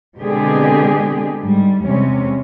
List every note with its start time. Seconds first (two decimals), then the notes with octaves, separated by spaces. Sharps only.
0.18 B2 D3 G#3 C4 G4 G#4
1.42 G#2 G3
1.84 E2 C3 G3 G#3 C4 C#4